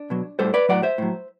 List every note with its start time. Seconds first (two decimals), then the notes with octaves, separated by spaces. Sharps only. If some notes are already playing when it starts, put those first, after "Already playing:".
Already playing: D4
0.10 B2 F#3
0.39 A2 G3 A4 C5
0.54 B4 D5
0.69 A2 F#3 D5 F#5
0.83 C5 E5
0.98 A2 F#3